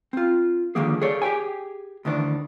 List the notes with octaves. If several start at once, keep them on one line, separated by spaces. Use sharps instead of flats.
C4 F4
D3 D#3 F3 G3 A#3 G#4
G#4 A4 C#5 D5
G4 G#4 G5 G#5
D2 D#3 E3 D4